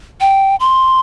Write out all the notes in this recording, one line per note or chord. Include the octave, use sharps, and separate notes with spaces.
G5
C6